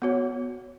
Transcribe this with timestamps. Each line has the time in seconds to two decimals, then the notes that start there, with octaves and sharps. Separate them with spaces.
0.02 B3 F#4 C#5